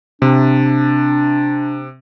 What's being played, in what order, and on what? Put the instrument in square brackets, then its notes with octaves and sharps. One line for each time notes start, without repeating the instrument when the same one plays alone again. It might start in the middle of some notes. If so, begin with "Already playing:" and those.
[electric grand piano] C3 [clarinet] D4